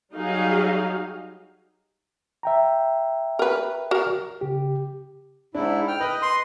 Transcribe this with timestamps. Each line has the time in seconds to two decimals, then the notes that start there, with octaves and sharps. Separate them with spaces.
0.14 F#3 G3 D#4 G#4 F5
2.43 E5 G5 A#5
3.39 A#4 B4
3.91 F#4 A#4
4.41 C#3 G4
5.55 G#2 D4 E4
5.88 G5 F6
6.00 B4 D#5
6.22 C6